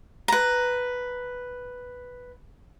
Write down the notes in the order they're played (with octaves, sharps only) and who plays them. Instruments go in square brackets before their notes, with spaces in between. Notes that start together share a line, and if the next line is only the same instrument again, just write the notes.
[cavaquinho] B4 A#5